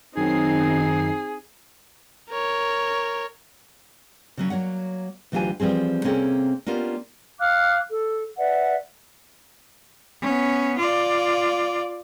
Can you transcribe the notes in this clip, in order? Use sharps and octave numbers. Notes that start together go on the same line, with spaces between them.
F#2 D#3 C4 D#4 G#4 C7
A#4 C#5
C#3 F#3 C#4
F#3 A#3 C#5 F#5
D2 E3 F#3 F4 G4 G#5
E3 F3 G3 C4 G#4
C3 A#3 C4 C#4 G#4 A4
A#3 B3 C#4 D4 F4 G4
F5 D6 F6 F#6
A4
B4 D5 E5 F#5
B3 C#4
F4 D5